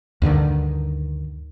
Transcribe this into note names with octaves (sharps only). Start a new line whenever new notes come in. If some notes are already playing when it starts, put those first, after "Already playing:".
D2 G2 D3 D#3